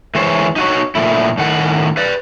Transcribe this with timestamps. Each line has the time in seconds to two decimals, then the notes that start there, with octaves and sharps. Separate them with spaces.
0.15 E3 G#3 C4 C5 C#5
0.56 D#4 F#4 C#5
0.95 A#2 F3 A3 E4
1.38 A2 D#3 F#5
1.97 B4 D5